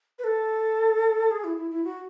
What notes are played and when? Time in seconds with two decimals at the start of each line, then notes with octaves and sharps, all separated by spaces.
0.19 B4
0.24 A4
1.31 G#4
1.44 E4
1.57 E4
1.71 E4
1.84 F#4